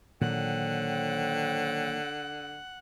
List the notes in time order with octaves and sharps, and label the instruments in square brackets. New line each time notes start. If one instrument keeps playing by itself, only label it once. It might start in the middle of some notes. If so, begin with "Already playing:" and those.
[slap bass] A#2 D#3 F#3 [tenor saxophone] D3 [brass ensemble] C5 C#5 G5 [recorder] F#5